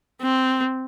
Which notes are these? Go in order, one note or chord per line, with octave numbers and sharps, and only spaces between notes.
C4